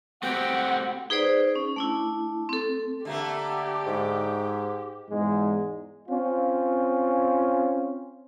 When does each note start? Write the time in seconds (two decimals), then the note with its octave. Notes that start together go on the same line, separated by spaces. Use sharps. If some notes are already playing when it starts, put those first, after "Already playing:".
0.23 A3 C4 F#4 G4 F#5 G5
1.10 D#4 G#4 B4 C5 D5
1.56 C#4
1.76 A3 D4 E4
2.49 C4 A4
3.05 D3 A3 A#3 G4
3.87 G#2
5.09 E2 G#2 G#3
6.07 C4 C#4 F4